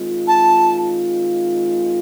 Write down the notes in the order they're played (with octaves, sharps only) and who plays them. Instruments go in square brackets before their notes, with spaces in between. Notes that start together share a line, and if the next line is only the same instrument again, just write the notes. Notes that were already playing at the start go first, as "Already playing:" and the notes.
Already playing: [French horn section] D#3 G#3 C4 F4
[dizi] A5